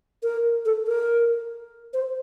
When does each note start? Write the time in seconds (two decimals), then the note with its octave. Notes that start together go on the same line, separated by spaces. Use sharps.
0.23 A#4
0.65 A4
0.87 A#4
1.94 C5